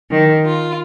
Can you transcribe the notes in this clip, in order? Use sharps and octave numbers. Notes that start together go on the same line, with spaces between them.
D#3
F4